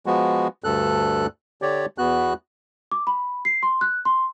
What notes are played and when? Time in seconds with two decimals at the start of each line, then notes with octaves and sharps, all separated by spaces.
0.06 F3 G#3 B3 F#4
0.64 D2 G2 A4 F#6
1.62 D3 G4 C#5 D5
1.98 E2 B3 F#4 F#6
2.91 D6
3.07 B5
3.45 C7
3.63 C6
3.81 F#6
4.05 C6